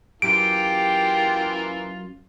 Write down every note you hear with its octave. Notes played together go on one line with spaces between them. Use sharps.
F#2 E3 A#3 F4 G4 D7